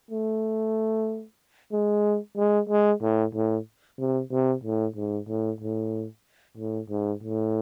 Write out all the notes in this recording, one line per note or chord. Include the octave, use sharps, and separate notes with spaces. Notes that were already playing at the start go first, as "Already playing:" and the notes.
A3
G#3
G#3
G#3
A2
A2
C3
C3
A2
G#2
A2
A2
A2
G#2
A2